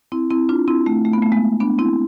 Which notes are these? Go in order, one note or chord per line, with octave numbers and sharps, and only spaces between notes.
C4 E4
C4 E4
D4 F4
C4 E4
A3 C4
A3
B3
A3
G#3 B3
B3 D4
C4 E4